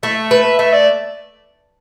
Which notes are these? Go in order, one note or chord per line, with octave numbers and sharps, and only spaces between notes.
A3 E5
B4
A3 E5
D5